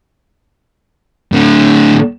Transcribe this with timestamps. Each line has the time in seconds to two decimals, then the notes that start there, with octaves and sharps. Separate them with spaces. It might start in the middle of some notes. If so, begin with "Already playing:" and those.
1.32 A2 D3